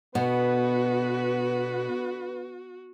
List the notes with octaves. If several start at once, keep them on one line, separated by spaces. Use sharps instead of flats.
B2 D3 B3 F#4 B4